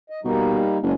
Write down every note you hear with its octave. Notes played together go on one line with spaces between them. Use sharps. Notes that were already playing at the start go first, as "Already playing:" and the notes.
D#5
B2 G3 A#3 D#4
F#1 G#3 C#4 D4